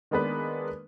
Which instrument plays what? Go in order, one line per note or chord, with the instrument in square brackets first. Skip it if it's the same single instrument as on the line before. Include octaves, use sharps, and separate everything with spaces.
[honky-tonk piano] D#3 G#3 A#3 B3 D4 B4